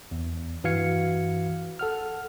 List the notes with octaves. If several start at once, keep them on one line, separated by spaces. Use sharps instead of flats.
E2
G2 E3 F#4 F5 G#6 C#7
A4 F#5 F6